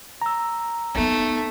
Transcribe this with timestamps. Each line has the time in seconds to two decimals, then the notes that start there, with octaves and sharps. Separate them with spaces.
0.22 A#5 E6
0.95 A3 B3 D#4